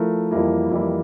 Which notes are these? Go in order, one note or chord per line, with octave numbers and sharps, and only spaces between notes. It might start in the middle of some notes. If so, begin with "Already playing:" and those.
Already playing: F3 A3 E4 A#4
F2 E3 G3 A#3 E4
F2 E3 G3 A#3 E4